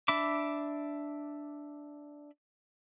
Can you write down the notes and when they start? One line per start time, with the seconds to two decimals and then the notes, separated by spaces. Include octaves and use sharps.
0.08 D4 E5 B5 D6